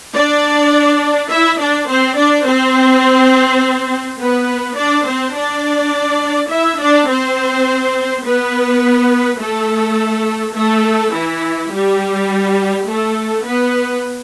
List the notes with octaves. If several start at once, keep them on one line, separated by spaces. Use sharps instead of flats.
D4 D5
E4 E5
D4 D5
C4 C5
D4 D5
C4 C5
B3 B4
D4 D5
C4 C5
D4 D5
E4 E5
D4 D5
C4 C5
B3 B4
A3 A4
A3 A4
E3 E4
G3 G4
A3 A4
B3 B4